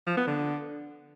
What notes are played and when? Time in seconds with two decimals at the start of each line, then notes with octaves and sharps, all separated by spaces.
0.07 F3
0.17 B3
0.27 D3